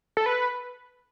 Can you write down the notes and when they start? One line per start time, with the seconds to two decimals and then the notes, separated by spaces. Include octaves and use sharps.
0.17 A4
0.26 B4